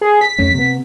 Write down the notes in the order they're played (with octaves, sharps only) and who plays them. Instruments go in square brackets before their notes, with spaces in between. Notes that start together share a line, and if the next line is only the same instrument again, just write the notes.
[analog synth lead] G#4
B6
[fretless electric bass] F2 A3 C#4
C3 B3